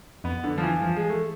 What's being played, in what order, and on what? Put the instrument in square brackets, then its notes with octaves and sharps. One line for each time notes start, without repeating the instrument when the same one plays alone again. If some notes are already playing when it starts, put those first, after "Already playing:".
[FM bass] F2 [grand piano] B3
[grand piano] D3
F3
E3
[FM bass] E3 [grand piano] F3
[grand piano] G#3
A3